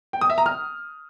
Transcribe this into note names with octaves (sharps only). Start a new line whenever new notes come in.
G5
D#6
E5
A#5
F6